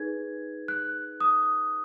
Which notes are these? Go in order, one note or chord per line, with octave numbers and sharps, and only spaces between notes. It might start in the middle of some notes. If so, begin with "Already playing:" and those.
Already playing: D#4 G#4 B4 G#6
F#6
D#6